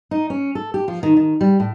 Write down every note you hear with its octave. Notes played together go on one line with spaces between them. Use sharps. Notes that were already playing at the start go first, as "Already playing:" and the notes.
D#4
C#4
A4
G4
F3
D#3
D#3
G3
A2